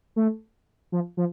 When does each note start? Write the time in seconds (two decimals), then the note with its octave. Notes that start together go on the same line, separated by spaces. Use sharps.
0.16 A3
0.92 F3
1.17 F3